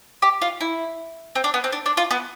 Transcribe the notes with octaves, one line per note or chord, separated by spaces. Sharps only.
G4
F4
E4
C4
D4
B3
C4
D4
D4
F4
B3